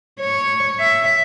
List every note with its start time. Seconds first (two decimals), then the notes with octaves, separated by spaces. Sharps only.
0.20 C#5
0.80 E5